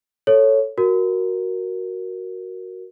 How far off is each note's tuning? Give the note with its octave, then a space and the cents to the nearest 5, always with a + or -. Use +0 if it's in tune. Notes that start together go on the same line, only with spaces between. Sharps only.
A4 +0 C#5 +0
F#4 +0 A#4 +0